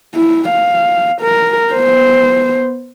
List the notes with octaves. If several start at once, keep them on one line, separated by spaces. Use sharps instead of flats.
E4
F5
A#4
B3 C5